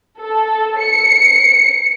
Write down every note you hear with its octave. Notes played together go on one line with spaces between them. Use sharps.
A4
C#7